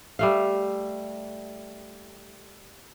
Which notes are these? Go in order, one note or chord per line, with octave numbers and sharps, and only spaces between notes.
G3 A3 F5